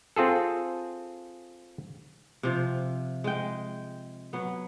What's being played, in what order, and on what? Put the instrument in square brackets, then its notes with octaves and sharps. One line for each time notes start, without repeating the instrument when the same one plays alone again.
[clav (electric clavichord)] C4 F4 G#4 A4
[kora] C3 F3
G#3 G5
F#3 B3